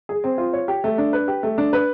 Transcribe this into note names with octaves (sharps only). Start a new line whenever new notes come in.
G#4
C4
F4
C#5
G4
A3
D4
B4
G4
A3
D4
B4